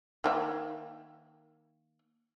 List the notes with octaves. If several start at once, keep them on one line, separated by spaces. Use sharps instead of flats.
D#3 A#3 E5